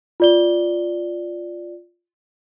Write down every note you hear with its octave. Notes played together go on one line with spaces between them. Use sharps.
F4 D5 G7